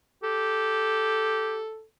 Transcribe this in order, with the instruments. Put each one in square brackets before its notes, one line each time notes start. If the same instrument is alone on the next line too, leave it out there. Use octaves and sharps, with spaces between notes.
[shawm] G4 [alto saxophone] A4